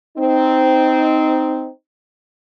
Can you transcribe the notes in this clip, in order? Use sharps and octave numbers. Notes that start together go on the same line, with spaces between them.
C4 D#4